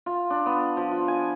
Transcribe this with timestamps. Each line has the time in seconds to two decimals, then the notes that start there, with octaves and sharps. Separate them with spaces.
0.06 F4
0.30 D4
0.46 B3
0.77 F3
0.91 F4
1.08 G#5